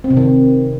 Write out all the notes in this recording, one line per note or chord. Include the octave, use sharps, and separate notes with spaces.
C4
C3
D#3